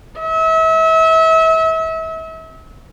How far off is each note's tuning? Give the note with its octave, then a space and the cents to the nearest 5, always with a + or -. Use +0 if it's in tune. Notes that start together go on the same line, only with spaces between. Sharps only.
E5 -35